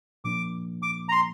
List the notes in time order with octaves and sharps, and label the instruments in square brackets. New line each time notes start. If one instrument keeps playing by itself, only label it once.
[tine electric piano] A#2 F3 A#3 D4 [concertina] D6
[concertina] D6
A#5
C6